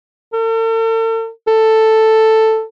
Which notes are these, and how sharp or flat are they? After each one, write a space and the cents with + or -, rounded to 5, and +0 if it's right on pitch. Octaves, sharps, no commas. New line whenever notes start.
A4 +45
A4 +5